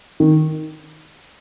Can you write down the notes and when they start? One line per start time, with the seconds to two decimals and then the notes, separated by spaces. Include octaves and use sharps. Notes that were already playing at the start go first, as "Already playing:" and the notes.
0.20 D#3